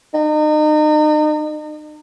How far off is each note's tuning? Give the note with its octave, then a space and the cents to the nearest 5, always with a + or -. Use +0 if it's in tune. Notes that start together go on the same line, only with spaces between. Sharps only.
D#4 -35